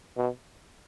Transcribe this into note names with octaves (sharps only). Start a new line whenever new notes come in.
B2